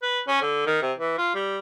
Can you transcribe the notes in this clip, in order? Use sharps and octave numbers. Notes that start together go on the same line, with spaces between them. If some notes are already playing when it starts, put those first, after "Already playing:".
B4
C#4
D3
D#3
C3
E3
F4
G3